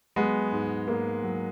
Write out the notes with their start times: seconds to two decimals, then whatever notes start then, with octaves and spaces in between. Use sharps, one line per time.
0.16 F#3 G#3 B3
0.52 G#2
0.88 G#2 A#3
1.23 F#3